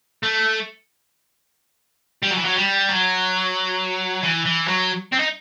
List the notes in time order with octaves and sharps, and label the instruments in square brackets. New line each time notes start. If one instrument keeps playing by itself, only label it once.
[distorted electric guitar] A3
G3
F#3
E3
F#3
G3
F#3
E3
E3
F#3
C4
D#4